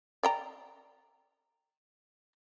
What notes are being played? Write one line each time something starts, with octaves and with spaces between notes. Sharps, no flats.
D5 G5 A#5